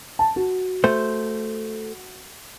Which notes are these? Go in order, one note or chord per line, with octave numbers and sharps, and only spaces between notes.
A5
F#4
A3 C5